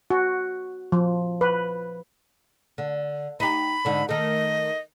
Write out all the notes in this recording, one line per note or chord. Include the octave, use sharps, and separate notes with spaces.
F#4
F3
B4
D3
D#4 G4 B5
G#2 D3 D4
D#3 A3 D#5